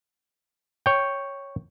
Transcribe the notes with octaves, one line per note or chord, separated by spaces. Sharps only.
C#5 G5